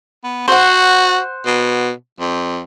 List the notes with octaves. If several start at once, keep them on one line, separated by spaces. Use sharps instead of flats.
B3
F#4 C5 F#5
B2
F2